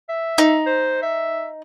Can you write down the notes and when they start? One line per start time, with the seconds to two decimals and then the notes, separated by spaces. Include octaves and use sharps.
0.09 E5
0.38 D#4
0.66 C5
1.02 E5